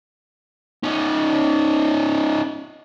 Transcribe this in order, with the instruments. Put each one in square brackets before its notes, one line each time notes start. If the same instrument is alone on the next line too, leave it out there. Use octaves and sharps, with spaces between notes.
[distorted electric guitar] C#4 D#4